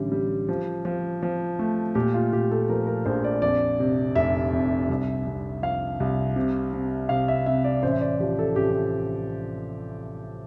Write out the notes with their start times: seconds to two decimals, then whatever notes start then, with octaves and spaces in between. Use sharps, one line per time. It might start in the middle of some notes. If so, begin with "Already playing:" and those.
Already playing: A1 D3 G3
0.12 G3
0.49 F3
0.85 F3
1.22 F3
1.59 A3
1.95 A#2 G4
2.14 F4
2.33 A#2 G4
2.51 A4
2.70 F3 A#4
2.87 A#4
3.06 A#1 C5
3.24 D5
3.42 F2 D5
3.80 C3
4.15 F1 E5
4.53 F2
4.89 C2
5.26 C2
5.62 F3 F5
6.00 C2
6.36 C3
6.73 C3
7.09 C3 F5
7.28 E5
7.46 C3 E5
7.64 D5
7.83 A1 C5
7.92 E5
8.01 D5
8.20 F3 G4
8.39 A4
8.56 A1 G4